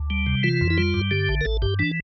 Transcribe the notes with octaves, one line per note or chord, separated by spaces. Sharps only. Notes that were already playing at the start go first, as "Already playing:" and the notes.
Already playing: D2
G3
C3
E3 F4
F2
E4
G3 F4
G2
D3 G4
A1
A#4
A1 A4
G2 G4
E3 D4